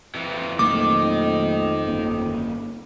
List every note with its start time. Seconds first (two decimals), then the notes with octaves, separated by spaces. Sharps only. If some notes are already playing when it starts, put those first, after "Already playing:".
0.15 F2 E3
0.59 B1 F2 D#3 A3 A#3 D6
1.87 G1 A#3 C#4